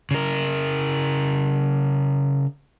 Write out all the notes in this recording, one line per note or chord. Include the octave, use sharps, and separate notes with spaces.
C#3 A#4